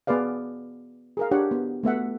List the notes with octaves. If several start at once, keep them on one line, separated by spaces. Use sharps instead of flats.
B3 G#4 B4 D5 F5
G#4 A#4 F5
D4 G4 C#5 F#5
B3
A3 B3 E5 F#5